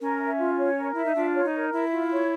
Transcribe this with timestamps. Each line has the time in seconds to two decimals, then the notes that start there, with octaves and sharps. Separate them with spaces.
0.01 C#4 A#4
0.20 E5
0.39 F4
0.58 C#5
0.78 A#4
0.94 E4 E5
1.05 D#4
1.15 D4 F4
1.34 C#5
1.44 D#4
1.54 A#4
1.73 E4 E5
1.92 F4
2.11 C#5